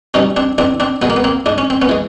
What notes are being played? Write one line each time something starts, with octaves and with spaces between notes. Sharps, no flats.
B2 G3 C#4 D#4
C4 D4
E2 C4 D4
C4 D4
B2 G#3 B3
A#3
B3
A#3 C4
G#2 D4
C#4
C4
B3 C#4
E3 G#3